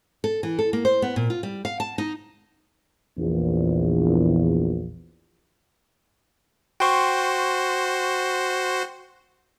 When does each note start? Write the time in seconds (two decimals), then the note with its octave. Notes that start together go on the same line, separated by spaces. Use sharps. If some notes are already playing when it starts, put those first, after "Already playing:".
0.24 A4
0.43 E3
0.59 A4
0.73 A#3
0.85 C5
1.02 B3
1.16 A#2
1.30 F4
1.43 G3
1.65 F5
1.80 A5
1.98 D#4
3.18 A#1 E2
6.80 F#4 C5 G5 C6 C#6